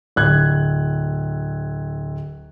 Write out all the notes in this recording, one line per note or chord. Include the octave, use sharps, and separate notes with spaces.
D1 F#6 G#6